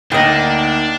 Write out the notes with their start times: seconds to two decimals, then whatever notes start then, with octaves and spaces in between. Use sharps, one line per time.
0.12 D2 A#3 D4 D#4 A#4 D#5 G5